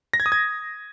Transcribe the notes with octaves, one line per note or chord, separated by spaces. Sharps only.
A#6
G#6
D#6
G#6